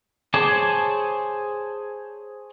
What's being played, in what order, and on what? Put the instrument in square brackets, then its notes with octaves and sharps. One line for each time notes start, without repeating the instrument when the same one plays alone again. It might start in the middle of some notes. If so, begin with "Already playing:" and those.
[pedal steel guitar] G#4 C5 C#5 A5 D6